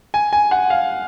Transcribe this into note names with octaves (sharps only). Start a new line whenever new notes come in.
G#5
G#5
F#5
F5